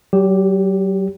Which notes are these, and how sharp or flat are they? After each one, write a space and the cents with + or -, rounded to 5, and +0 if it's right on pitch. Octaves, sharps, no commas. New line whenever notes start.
F#3 +40 G4 +0